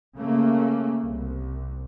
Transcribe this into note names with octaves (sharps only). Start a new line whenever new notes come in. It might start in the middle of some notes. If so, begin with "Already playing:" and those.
C#3 A3 A#3
C2